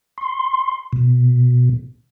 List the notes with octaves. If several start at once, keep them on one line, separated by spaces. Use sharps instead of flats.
C6
B2